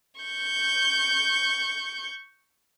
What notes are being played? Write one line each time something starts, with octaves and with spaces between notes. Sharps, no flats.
C#6 G6